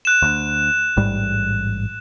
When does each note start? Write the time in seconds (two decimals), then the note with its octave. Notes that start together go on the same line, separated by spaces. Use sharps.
0.05 F#6 E7
0.22 D2
0.97 A1 G#2 G3